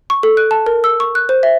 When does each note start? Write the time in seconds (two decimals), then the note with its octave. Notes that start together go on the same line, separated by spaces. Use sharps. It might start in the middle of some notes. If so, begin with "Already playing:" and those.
0.10 C#6
0.23 A4
0.37 F#6
0.51 A5
0.66 A#4
0.84 E6
1.00 C#6
1.15 F#6
1.29 C5
1.43 E5